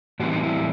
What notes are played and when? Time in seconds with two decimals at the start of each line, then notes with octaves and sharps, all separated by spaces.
0.20 A2 E3 G3 C4 F#4
0.33 D#4
0.43 E4